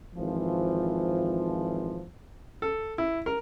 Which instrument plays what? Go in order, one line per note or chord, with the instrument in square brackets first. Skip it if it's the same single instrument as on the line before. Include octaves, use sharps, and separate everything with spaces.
[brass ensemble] G#1 E3 F3
[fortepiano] A4
E4
A#4